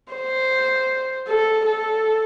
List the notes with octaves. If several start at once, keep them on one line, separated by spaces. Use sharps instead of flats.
C5
A4
A4